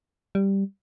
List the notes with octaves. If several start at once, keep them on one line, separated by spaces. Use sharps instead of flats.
G3